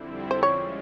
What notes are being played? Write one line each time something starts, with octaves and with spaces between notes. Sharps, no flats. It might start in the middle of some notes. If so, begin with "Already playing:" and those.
Already playing: F2 D3 G3 C4 E4
C5
G#3 C#4 F4 C#5